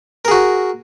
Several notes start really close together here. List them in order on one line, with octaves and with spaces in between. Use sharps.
A#4 G#4 F#4